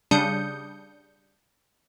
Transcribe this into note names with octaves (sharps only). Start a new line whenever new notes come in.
C#3 G3 D4 D#6 G6 C#7